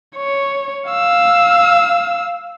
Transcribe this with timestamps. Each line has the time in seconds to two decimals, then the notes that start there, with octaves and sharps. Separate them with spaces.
0.17 C#5
0.90 F5 E6